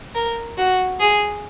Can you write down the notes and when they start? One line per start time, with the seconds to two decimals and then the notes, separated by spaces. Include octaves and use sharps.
0.15 A#4
0.57 F#4
1.00 G#4